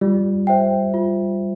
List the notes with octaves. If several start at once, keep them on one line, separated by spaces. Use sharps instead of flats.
G3 F4
C5 E5 G5
F4